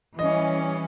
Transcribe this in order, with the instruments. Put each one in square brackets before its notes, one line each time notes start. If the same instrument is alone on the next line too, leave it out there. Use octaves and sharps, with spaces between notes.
[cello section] E3 G3 C#4 [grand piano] D#5